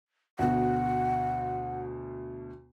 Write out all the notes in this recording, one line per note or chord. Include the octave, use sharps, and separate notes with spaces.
D2 B2 F#5